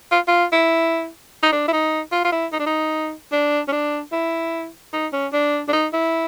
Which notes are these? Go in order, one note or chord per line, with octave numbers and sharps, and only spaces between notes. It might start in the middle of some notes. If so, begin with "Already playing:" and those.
F4
F4
E4
D#4
D4
E4
D#4
F4
F4
E4
D#4
D4
D#4
D4
C#4
D4
E4
D#4
C#4
D4
D4
D#4
E4